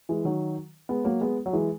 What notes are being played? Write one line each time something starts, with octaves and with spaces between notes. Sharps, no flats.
E3 G#3
D#3 F#3
G#3 B3
F#3 A#3
G#3 B3
F#3
E3 G#3